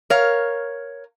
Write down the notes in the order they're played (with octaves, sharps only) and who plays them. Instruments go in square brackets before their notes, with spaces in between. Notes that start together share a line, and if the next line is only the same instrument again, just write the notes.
[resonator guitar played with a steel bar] A#4 C#5 F5